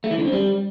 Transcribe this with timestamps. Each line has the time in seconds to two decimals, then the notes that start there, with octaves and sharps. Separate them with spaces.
0.04 A3
0.11 E3
0.18 D3
0.25 C4
0.32 G3